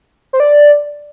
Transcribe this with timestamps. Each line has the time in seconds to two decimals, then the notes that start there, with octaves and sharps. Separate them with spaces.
0.33 C5
0.40 D5